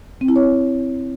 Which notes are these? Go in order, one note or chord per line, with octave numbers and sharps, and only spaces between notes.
C4
E4
C#5